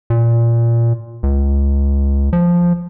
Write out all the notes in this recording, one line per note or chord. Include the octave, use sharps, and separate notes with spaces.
A#2
C#2
F3